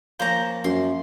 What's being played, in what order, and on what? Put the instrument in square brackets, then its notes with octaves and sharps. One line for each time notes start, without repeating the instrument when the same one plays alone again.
[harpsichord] F3 A#3 C#4 [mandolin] C5 A#5
[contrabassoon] F#2 [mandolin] C6